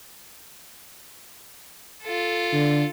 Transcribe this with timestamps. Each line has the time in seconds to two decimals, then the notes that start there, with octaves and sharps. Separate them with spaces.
2.03 F4 A4
2.53 D3